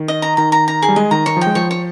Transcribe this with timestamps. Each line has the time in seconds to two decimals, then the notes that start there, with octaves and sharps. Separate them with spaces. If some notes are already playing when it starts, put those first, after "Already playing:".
Already playing: D#3
0.08 D#5
0.22 A#5
0.37 D#3 A#5
0.52 A#5
0.68 A#5
0.82 G#4
0.89 G3
0.96 G#3 D#5
1.11 D#3 A#5
1.26 D#3 C#5
1.37 F3 G5
1.47 G#3
1.55 F3 C#5
1.71 C#5